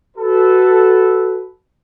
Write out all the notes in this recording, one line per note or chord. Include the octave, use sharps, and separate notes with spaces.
F#4 A4 B4